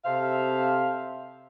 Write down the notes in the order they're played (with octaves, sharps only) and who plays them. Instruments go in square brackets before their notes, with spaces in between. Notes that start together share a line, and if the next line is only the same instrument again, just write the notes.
[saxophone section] C3 A4 C5 E5 F5